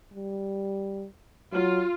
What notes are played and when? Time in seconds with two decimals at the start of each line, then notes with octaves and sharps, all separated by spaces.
0.14 G3
1.53 F#3 F4